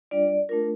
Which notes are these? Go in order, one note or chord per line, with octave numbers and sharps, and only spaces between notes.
G3 D4 F4 D5
A3 D4 F4 A#4